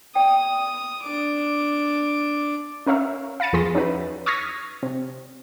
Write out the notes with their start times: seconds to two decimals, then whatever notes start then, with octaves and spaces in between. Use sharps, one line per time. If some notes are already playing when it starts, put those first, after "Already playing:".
0.15 D5 G5 D#6
1.03 D4 D6
2.87 C#4 A#4 C#5 E5 F5
3.40 F5 B5 A6 C#7 D#7
3.53 E2 F3 G#4 C6 A#6
3.75 C#4 D#4 E4 F#4 B4
4.26 C#6 D#6 F6 G#6 A#6 B6
4.83 C3